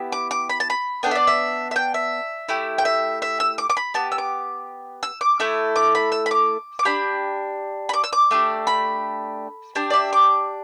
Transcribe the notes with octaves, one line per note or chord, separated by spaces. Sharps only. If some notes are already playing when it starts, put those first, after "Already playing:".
Already playing: B3 E4 G4
D6
D6
B5
A5
B5
B3 D4 A4 G5
E5
D5
E5
E5
G5
E5
A3 E4 G4
G5
E5
E5
E6
D6
D6
B5
B3 G4 A5
E6
D6
E6
D6
A3 E4 A4
D6
B5
E6
B5
D6
D6
D4 G4 B5
B5
D6
E6
D6
A3 D4 G4
B5
D4 G4 A5
D5
E5
D6